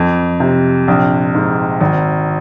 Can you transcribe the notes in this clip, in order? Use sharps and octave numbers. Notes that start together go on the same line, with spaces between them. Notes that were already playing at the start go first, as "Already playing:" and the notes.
Already playing: F2
C3
A#1
G#2
G#1